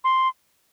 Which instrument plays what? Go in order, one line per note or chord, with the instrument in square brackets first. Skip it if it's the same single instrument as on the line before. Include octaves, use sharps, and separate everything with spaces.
[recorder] C6